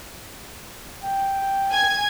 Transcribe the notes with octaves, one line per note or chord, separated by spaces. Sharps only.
G5
G#5 G#6